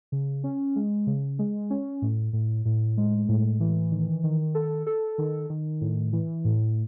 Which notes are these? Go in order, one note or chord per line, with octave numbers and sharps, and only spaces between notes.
C#3
C#4
G#3
C#3
G#3
C#4
A2
A2
A2
G#3
A2
E3
D#3
D#3
A4
A4
D#3
D#3
A2
E3
A2